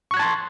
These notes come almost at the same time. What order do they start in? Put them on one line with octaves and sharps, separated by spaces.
C#6 F#6 G#6 A5 C6